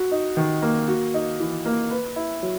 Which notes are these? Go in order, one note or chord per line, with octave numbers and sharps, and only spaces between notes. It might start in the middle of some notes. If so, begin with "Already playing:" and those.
Already playing: F#4
D#4
D#3
A#3
F#4
D#4
E3
A#3
B4
E4
F#3